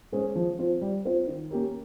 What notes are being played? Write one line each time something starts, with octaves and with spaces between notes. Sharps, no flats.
G#3 C#4 G#4 C5
F3
C4 F4
G3
C4 F4 C5
D#3
A#3 C#4 G4 A#4